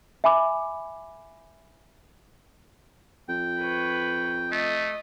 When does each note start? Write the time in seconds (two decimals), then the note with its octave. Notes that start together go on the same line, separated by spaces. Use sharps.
0.24 E5 G#5 B5 D6
3.29 F2 G5
3.59 B4 C#5
4.52 A3 D#5